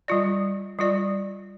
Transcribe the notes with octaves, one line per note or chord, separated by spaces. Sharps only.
G3 F4 D5
G3 F4 D5